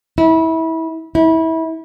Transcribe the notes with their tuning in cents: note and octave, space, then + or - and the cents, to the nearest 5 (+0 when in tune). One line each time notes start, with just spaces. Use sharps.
E4 -25
E4 -25